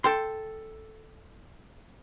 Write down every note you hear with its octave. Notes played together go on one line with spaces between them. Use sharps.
A4 G5 C6